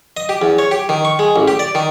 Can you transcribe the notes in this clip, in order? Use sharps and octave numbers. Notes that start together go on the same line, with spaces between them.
D#5
G4
E2
C#5
G4
D#3
C#6
G#3
A1
G4
D5
D#3